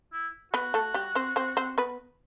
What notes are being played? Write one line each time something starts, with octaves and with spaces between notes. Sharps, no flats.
E4
B3 F#4 B4
A3 A4
G3 G4
C4 C5
C4 C5
C4 C5
B3 B4